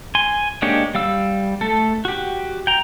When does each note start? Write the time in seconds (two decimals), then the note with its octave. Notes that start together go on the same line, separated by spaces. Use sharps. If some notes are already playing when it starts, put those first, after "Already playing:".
0.15 G#5 C6
0.62 G#3 A#3 D4 G4 C#5
0.95 G3 F5 E6
1.61 A3 A4
2.05 F#4 G4
2.67 G5 A#5